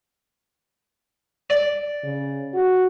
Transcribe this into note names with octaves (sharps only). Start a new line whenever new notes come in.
D5
C#3
F#4